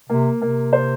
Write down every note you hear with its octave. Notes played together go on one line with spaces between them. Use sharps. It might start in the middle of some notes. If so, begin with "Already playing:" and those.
C3 A#3
C3 A#3
C5